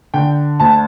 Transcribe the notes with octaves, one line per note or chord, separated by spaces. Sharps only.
D3 G5
D2 A5